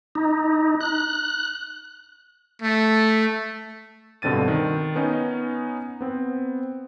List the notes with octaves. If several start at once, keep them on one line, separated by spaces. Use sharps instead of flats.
D#4
F#6
A3
G2 B2 D3 C4 A6 D#7
D#3
B3 C#4 D#4
B3 C4